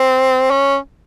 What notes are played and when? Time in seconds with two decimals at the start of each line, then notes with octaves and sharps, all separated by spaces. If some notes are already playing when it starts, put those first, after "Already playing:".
Already playing: C4
0.51 C#4